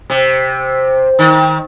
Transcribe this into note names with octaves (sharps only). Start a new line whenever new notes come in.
C3
D#3